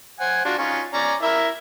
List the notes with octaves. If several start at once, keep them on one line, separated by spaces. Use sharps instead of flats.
C5 F#5 G#5
D4 F4 F#4
C#4 D#4 F4
C#4 D5 A#5
E4 A#4 E5